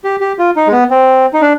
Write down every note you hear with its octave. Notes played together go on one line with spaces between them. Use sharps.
G4
G4
F4
D#4
G#3
B3
C4
D#4
D4